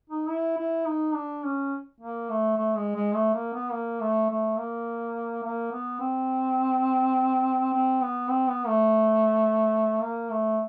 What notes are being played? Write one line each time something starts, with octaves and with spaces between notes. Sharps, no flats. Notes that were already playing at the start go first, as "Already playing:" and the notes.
D#4
E4
E4
D#4
D4
C#4
A#3
A3
A3
G#3
G#3
A3
A#3
B3
A#3
A3
A3
A#3
A#3
B3
C4
C4
B3
C4
B3
A3
A#3
A3